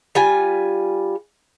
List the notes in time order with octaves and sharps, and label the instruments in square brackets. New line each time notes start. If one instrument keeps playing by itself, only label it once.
[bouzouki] G3 F4 G#5